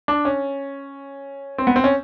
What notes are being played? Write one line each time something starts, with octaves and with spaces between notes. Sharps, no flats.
D4
C#4
C4
B3
C4
C#4